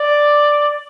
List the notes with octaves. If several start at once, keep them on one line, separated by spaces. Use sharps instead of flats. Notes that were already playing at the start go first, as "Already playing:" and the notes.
Already playing: D5